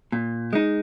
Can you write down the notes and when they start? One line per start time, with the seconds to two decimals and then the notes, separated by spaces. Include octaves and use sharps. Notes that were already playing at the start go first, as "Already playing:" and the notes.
0.12 A#2
0.53 G#3 D#4